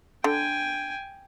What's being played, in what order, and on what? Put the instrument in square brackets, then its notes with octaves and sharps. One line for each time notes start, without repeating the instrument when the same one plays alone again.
[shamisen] D3 [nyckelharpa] G5 G#5